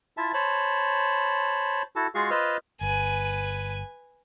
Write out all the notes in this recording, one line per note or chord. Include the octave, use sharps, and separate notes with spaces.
E4 F4 E5 A5
C5 C#5 A5 B5
E4 F#4 A4 A5
G#3 F4 F#4 G#4 F5 C#6
F4 B4 C5 D#5 E6 F6
G1 B4 G#5